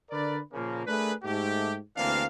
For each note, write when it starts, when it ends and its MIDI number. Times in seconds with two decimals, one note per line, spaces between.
0.11 0.38 50
0.11 0.38 70
0.11 0.38 71
0.11 0.38 74
0.53 0.82 46
0.53 0.82 49
0.53 0.82 53
0.53 0.82 58
0.86 1.13 57
0.86 1.13 62
0.86 1.13 68
0.86 1.13 70
0.86 1.13 71
1.23 1.76 44
1.23 1.76 57
1.23 1.76 67
1.96 2.24 38
1.96 2.24 52
1.96 2.24 58
1.96 2.24 60
1.96 2.24 62
1.96 2.24 77